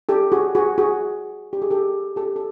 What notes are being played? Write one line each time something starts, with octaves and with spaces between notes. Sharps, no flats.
G4 A4
F#4 G#4
F#4 G#4
F#4 G#4
G4
G#4
G4 A4
G4 A4
A4